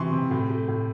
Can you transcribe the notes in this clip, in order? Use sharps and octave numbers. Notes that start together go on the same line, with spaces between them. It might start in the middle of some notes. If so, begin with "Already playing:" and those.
Already playing: C3 E3 C6 C#6
C3
A2
A3
A2